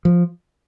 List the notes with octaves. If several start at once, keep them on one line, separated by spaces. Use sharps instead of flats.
F3